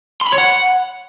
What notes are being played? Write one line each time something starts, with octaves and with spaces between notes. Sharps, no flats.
C6
B5
C#5
F#5